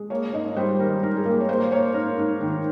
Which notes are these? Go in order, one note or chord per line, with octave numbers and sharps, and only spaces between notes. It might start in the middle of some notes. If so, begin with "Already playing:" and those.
Already playing: G#3
A#3 C#5
G#2 D#5
G3 C5
D#3 A#4
G#2 A#4
G#4
A#3 A#4
C#5
A#3 C5
A#3 C#5
G#2 A#4
G#2
D#3